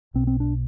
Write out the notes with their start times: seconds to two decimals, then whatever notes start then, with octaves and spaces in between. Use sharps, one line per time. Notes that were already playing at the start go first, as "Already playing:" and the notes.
0.14 B1 B2 C4
0.27 C4
0.40 D4